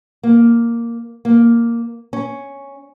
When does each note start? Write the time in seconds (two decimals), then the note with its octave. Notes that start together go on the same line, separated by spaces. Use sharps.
0.23 A#3
1.25 A#3
2.13 C#4